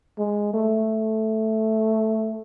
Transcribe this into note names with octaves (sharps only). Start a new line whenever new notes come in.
G#3
A3